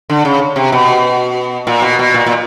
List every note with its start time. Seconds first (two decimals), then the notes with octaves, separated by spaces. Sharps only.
0.10 D3
0.25 C#3
0.56 C3
0.72 B2
1.67 A#2
1.82 B2
1.99 B2
2.14 A#2
2.26 A#2